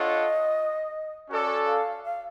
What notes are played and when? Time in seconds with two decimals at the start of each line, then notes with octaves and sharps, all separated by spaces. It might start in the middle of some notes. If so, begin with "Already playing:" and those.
Already playing: D4 F4 A4 C#5 D#5 F#5
1.29 C#4 F#4 A4 D5
1.66 F5
2.04 F5